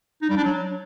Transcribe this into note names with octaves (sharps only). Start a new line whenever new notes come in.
D#4
G3
D4
F#3